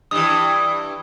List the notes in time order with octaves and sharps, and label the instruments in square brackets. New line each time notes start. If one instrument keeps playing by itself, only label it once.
[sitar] G2 E3 [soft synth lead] D#6